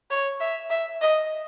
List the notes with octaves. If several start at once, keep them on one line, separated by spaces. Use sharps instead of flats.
C#5
E5
E5
D#5